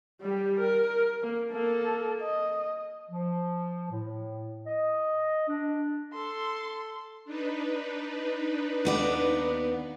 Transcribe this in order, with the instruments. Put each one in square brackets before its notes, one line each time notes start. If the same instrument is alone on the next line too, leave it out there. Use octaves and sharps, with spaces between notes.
[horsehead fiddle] G3 G4
A#4
A#3
A#3 A4
D#5
[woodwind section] F3
A2
D#5
D4
[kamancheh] A4 C6
[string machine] D4 D#4 B4
[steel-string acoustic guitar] D#2 B3 D5